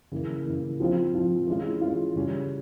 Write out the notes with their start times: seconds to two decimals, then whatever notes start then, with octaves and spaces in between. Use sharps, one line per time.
0.12 C#3 E3 A#3
0.46 C#3 E3 A#3
0.80 F3 C4 F4
1.14 F3 C4 F4
1.47 E3 G#3 C#4 F4
1.81 E3 G#3 C#4 F4
2.16 C#3 G3 C#4